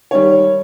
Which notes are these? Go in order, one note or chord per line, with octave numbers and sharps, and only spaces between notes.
D#3 G3 C#5